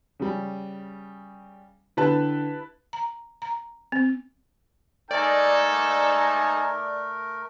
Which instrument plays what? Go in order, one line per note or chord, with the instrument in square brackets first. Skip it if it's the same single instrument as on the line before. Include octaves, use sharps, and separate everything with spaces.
[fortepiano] C#3 G3
[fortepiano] D3 G4 [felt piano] E4 B4 A5
[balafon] A#5
A#5
C4
[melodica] A3 A#4 [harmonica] D#4 G#5 A#5 [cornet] A4 [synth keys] D5